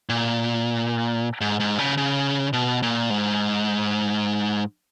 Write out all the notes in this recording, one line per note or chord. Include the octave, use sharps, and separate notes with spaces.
A#2
G#2
G#2
C#3
C#3
B2
A#2
G#2